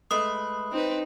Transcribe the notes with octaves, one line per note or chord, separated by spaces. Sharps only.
G#3 A3 B4 D#6
C4 D#4 B4